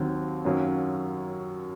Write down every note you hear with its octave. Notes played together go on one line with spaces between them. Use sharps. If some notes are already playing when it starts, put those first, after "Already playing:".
Already playing: D#2 D#3 F#3 C4
F#2 D#3 F#3 A#3 C#4